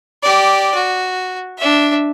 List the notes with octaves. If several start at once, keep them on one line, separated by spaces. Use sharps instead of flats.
G4 D5
F#4
D4 E5